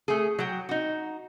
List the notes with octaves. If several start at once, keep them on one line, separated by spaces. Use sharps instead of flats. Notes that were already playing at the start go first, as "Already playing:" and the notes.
A3 G#4
F#3 F#5 G5
D#4 F#4